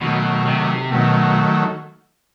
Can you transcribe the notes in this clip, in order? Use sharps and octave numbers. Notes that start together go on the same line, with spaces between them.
B2 D#3 F#3 A3
C3
B2 D#3 F#3 A3